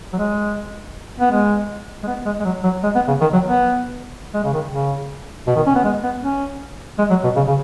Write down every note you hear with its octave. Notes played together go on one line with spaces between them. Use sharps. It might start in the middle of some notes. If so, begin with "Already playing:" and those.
F#3
G#3
B3
G#3
G#3
B3
G#3
G#3
F#3
F#3
G#3
B3
C#3
D#3
F#3
B3
G#3
C#3
D#3
C#3
B2
D#3
C#4
B3
G#3
B3
C#4
G#3
F#3
B2
C#3
C#3